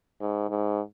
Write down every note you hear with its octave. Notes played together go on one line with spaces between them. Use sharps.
G#2
G#2